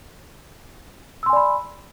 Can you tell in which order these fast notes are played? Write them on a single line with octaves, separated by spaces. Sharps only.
E6 C6 G#5 D5 B5